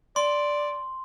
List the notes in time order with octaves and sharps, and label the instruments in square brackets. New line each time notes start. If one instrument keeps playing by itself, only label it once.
[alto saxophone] D5 [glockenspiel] C6